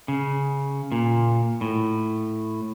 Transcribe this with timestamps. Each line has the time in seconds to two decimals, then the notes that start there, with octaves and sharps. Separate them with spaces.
0.08 C#3
0.92 A#2
1.61 A2